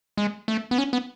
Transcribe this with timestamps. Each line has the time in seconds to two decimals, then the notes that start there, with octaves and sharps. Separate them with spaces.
0.17 G#3
0.48 A3
0.71 B3
0.78 C#4
0.93 B3